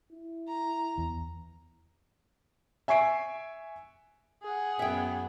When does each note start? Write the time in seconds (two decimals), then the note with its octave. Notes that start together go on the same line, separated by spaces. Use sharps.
0.13 E4
0.48 A#5
0.98 E2
2.88 E5 G#5 C#6 C7 D7
4.43 G#4 F#5
4.79 F#2 B3 E5 G5